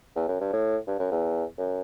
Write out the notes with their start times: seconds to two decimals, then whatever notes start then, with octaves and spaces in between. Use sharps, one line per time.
0.16 E2
0.28 F#2
0.41 G2
0.53 A2
0.87 G2
0.99 F#2
1.11 E2
1.58 F#2